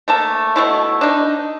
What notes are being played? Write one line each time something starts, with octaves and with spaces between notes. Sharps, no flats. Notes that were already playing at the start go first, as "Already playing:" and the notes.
A3 A#3 A5
B2 A3 E4
D4 D#4